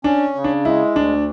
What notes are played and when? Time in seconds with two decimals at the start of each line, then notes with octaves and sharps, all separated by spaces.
0.04 C#4 D4
0.35 C#3
0.44 D4
0.65 G#3 E4
0.96 D2 D4